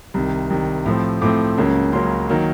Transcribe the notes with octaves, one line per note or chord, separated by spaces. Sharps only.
C2 C3 D#3
C2 C3 D#3
A2 F3 A3 C4
A2 F3 A3 C4 D6
C#2 C#3 F#3 A#3 C#4
C#2 C#3 F#3 A#3 C#4 C6
D#3 F#3 A#3